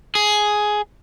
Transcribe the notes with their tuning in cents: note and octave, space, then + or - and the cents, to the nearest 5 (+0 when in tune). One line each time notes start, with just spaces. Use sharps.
G#4 +10